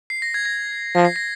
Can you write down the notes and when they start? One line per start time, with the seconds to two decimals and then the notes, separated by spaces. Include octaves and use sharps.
0.10 C7
0.22 A#6
0.34 G#6
0.45 A#6
0.95 F3 A#6
1.05 C7
1.16 A#6